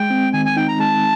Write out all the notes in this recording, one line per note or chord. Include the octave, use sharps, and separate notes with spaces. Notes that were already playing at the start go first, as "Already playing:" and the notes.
Already playing: G#3 G5
C4
D#3 G#5
G#5
D#4 G5
A#5
G#3 A5